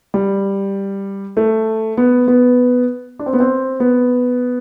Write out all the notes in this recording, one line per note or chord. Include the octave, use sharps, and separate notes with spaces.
G3
A3
B3
B3
D4
C4
B3
C4
B3